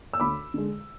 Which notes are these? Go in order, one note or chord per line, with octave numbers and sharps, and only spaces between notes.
E6
D2 B5 D6
D3 G#3